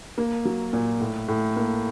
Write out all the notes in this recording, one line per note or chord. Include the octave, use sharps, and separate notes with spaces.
A#3
F#3
A#2
A2
A2
A#3